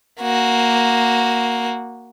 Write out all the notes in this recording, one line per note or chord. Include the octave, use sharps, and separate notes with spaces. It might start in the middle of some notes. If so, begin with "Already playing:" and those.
A#3 F#4